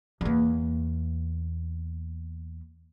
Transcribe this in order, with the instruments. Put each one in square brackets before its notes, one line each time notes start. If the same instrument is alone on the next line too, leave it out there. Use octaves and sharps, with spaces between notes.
[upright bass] E2 A#3